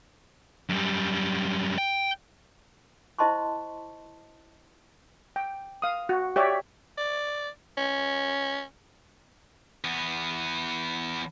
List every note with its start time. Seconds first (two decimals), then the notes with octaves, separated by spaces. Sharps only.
0.69 F#2 G3
1.78 G5
3.19 E4 C5 D#5 A5 C6 C#6
5.36 G5
5.82 F5 D#6
6.09 F#4
6.36 G4 C#5 D5 E5
6.98 D5
7.78 C#4
9.84 E2 B3